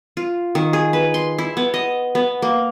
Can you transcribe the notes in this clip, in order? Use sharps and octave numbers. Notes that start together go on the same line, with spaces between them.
F4
D#3
G#4
B4
C6
E4
B3
D#5
B3
A#3